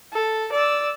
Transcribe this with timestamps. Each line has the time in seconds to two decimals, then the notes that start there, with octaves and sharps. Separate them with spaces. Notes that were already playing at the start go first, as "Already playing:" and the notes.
0.13 A4
0.53 D5 E6